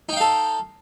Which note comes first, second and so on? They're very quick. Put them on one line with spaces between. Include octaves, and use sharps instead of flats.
D#4 G5 F5 A4